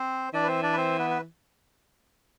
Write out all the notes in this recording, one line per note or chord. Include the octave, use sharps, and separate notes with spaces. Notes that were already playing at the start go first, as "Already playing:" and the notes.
Already playing: C4 C5
E3 D4 D5
B4
C4 C5
D4 D5
B4
C4 C5
B3 B4
B4